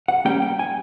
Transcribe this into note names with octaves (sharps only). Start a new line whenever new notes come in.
F#5
G3 A#3 C#4 G5
G5
G#5